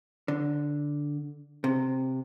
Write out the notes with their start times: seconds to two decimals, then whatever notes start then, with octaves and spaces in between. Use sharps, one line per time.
0.28 D3
1.64 C3